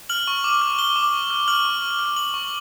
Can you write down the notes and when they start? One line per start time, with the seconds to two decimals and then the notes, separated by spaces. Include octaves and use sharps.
0.09 F6 F#7
0.27 C#6
0.44 D6
0.62 F6
0.79 F6 G7
0.96 D6
1.13 C#6
1.30 F6
1.48 F6 F#7
1.65 C#6
1.82 C#6
1.99 F6
2.17 F6 F#7
2.34 C#6